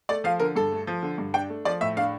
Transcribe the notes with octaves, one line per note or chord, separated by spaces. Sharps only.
A3 D5
F3 F5
D3 A#4
G2 A4
A3
F3
D3
G2
D4 G5
A3
F3 D5
A2 E5
D4 F5